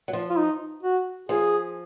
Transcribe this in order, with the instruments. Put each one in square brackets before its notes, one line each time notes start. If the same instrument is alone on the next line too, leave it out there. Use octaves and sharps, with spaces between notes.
[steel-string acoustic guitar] F#3
F3
[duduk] F4
D#4
F#4
[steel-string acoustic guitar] F3 [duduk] G#4